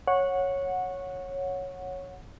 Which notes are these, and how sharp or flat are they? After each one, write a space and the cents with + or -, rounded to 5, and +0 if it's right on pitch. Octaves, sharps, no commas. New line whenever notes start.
C#5 -5 F#5 -15